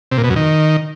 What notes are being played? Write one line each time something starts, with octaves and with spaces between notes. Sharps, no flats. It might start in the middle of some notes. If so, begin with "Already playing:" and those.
C3
A#2
B2
F#2
D#3